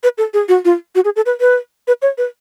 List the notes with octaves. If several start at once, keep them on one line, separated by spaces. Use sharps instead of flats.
B4
A4
G#4
F#4
F4
F#4
G#4
A4
B4
B4
B4
C#5
B4